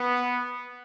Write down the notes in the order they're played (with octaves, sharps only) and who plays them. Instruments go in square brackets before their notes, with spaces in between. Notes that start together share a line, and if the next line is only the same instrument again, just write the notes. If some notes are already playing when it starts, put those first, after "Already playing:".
Already playing: [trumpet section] B3